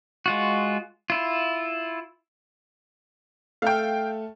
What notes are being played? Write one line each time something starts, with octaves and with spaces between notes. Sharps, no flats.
G#3 F4 F#4
E4 F4
A3 A4 F5 G5 F6